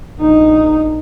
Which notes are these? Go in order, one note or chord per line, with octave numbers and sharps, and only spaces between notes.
A#1 D#4